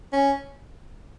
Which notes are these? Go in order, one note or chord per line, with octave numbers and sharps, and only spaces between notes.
C#4